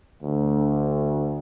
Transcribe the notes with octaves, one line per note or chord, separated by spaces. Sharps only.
D2